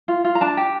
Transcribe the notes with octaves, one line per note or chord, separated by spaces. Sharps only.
F4
F4
A#5
D4 A5
G4